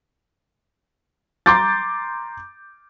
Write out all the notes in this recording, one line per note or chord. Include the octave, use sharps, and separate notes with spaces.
A#5 C6 D6 G6 A6